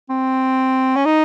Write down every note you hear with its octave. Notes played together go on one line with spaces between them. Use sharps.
C4
C#4
D#4